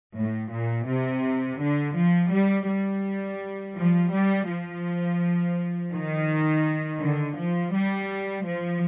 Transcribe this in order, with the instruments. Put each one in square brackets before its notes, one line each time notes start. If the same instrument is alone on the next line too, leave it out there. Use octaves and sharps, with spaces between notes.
[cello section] A2
A#2
C3
D3
F3
G3
G3
F3
G3
F3
D#3
D3
F3
G3
F3